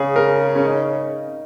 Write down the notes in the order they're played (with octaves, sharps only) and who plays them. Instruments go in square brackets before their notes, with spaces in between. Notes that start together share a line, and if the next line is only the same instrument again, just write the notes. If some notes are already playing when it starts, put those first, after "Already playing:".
Already playing: [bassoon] C#3 [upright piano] G#4
[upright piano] A#4
C#4
D#4